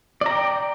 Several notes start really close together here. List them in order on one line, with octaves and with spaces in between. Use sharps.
D5 A#5 G5